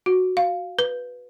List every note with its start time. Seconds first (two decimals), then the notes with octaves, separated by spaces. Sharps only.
0.06 F#4
0.37 F5
0.79 B4